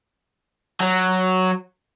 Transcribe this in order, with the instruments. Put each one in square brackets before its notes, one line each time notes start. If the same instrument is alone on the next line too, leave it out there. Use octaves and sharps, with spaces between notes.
[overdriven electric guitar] F#3